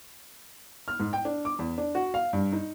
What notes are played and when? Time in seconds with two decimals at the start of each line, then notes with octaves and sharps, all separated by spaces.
0.88 F6
1.00 G#2
1.13 G5
1.25 D4
1.45 D6
1.59 E2
1.78 D4
1.95 F#4
2.14 F5
2.33 G2
2.52 D#4